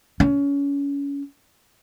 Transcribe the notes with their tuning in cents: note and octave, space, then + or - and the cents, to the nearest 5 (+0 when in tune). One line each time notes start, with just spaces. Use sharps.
C#4 +25